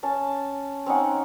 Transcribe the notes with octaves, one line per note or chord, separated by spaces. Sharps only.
C#4 A5
C4 C#4 D#4 F#5